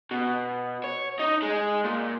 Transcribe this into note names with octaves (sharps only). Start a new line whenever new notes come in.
B2
C#5
D#4
G#3
A#2